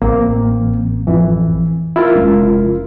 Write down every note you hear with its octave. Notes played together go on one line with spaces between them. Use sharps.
A1 A#3 C4
F2 E3
E4 F4 A#4
F1 G#3 C#4